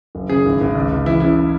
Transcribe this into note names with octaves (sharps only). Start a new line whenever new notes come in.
F#1
C#3 G#4
G#1
G#1
C#2
C#2
E3 E4
C#3 E4